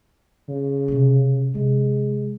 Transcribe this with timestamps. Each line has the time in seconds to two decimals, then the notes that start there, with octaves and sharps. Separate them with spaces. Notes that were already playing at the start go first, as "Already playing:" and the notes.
0.49 C#3
0.88 C3 C#4
1.55 C3 G#3